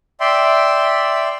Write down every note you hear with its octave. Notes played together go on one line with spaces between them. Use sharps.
D5 E5 G5 C6